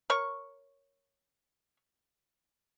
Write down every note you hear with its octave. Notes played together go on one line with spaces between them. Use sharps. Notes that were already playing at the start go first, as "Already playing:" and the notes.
A#4 C#5 C#6